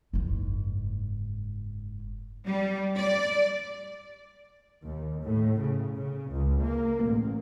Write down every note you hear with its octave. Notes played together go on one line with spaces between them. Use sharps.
F#1 G#2
G3
D5
D#2
A2
C#3
C#3
C#2
A#3
A1